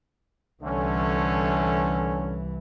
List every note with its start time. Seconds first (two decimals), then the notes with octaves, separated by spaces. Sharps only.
0.63 C2 D3 E3 A3 C#4